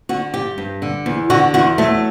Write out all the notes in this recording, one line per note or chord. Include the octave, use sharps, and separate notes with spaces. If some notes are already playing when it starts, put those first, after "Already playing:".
D3 F#4
G2 G4
G2
D3
E2
D3 F#4
E2 F#4
F#3 A3